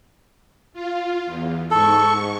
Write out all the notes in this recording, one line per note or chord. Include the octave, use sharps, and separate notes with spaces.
F4
E2
G#2 A4 C#6